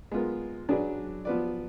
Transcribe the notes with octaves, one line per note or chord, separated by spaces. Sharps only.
G#3 B3 F4 A#4
F#3 D4 G#4 B4 D5
F3 B3 F4 B4 D5